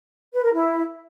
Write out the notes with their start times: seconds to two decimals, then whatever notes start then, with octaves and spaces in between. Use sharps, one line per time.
0.33 B4
0.44 A#4
0.54 E4